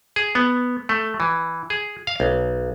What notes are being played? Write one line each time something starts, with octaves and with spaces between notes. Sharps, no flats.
G#4
B3
A3
E3
G#4
F5
B1